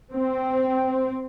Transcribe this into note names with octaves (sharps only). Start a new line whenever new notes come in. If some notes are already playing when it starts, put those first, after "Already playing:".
C4